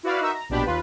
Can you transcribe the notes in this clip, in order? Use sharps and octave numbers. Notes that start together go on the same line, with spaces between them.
E4 F#4 B4 D5 F5 B5
D#4 F#4 A#4 E5
A#5
A#1 B2 D4 G4 B5
D#2 F4 B4